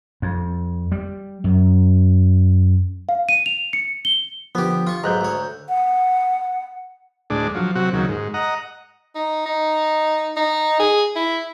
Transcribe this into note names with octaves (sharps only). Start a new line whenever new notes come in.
F2
G3
F#2
F5
D#7
F7
C#7
G7
D3 F3 B3 G4
F4 C#6
B1 G#2 A#5 F#6 G6
D2 C#5
F#5
D2 A2 G#3 D4
F3 F#3
C3 F#3 F#4
D#2 C#3 F#3
G#2
D#5 F#5 A#5
D#4
D#4
D#4
G#4
E4